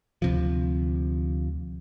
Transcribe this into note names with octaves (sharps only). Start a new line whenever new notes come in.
D2 C3 F3